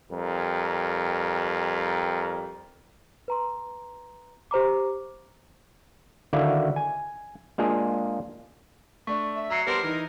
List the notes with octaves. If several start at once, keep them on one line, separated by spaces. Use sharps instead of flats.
F2 G3 A#4
B4 A#5 C6
G4 C5 A#5 D6
D3 D#3 E4 F#4 D5 F5
G#5
G#3 A#3 D4 F4 G#4
A3 D4 C#6
E5
F#3 A#5 E6 C7 C#7
G3 B3 D4 A#4 C5 C6
E3 D#4 A#4